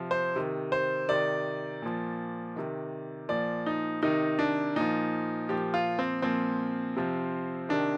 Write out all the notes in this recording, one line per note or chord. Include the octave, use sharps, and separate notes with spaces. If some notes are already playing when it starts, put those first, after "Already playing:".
Already playing: C3 F3
C5
C3 D#3
C5
C3 D#3 D5
A#2 F3
C3 D#3
A#2 F3 D5
D#4
C3 D#3 D#4
D4
A#2 F3 D#4
A#2 F3 G4
F4
C4
A#2 F3 C4
C3 F3
C3 D#3 D4